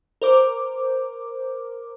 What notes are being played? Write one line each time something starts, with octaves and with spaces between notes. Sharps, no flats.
A#4 C5 D6